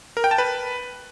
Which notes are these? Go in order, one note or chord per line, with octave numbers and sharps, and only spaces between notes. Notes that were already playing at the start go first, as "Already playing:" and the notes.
A#4
G5
A5
B4